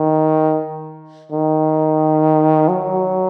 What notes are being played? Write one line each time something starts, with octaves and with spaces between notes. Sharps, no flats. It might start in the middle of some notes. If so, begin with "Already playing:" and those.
Already playing: D#3
D#3
F#3